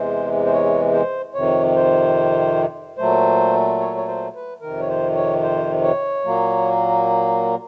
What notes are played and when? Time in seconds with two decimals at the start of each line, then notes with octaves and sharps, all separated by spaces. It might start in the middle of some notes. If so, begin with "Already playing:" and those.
Already playing: E2 C3 E3 G#3 C5
0.45 C5
0.52 C#5
0.93 C5
1.34 F2 C3 D#3 C#5
1.76 C5
2.98 A#2 F#3 A3 C5
3.80 C#5
3.97 C#5
4.07 C5
4.35 B4
4.61 F2 C3 D#3 A#4
4.80 C#5
4.89 C5
5.15 C#5
5.43 C5
5.84 C#5
6.25 A#2 F#3 A#3